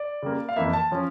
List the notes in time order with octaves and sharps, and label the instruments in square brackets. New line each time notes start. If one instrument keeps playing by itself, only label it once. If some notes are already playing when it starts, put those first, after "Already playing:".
Already playing: [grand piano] D5
C#3 G3 A#3
F5
F2 E3 A#3 E5
A5
F3 C#4